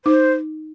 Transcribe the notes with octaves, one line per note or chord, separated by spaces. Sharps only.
D#4 C5